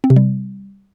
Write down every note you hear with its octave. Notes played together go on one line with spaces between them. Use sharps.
C4
C3
G3